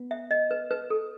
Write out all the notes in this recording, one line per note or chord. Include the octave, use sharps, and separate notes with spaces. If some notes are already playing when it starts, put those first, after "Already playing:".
Already playing: B3
E5
D#5
B4
B4
A4